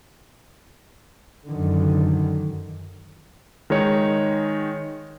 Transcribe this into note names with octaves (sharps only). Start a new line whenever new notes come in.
F#2 D3 D#3
D#3 G#3 D#4 C#5